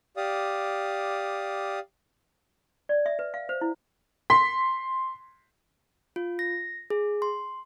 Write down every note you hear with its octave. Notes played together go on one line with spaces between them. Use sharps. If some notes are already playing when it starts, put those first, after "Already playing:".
G4 D5 F5 D#6
D5
E5
B4
F5
C5
E4
C6 B6
F4
A#6
G#4
C6